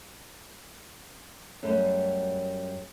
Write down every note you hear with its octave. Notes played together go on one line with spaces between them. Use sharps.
F#2 G3 A3